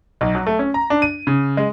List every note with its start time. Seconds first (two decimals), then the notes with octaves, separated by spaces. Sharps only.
0.21 B1
0.35 F#3
0.47 A3
0.59 C#4
0.74 A#5
0.90 D4
1.02 D#7
1.27 C#3
1.57 G#3